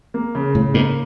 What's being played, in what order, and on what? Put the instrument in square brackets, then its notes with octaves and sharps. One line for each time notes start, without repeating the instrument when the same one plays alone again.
[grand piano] A#3
C#3
[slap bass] A2 [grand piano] C#3
[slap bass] G#2 [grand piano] A#3